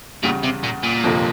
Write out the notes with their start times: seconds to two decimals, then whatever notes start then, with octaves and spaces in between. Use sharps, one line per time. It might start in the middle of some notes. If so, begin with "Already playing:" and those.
0.23 E2 A#2 C#3 G3
0.43 C3
0.64 A#2
0.83 A#2
1.03 G1 F2 C3 F3 A#3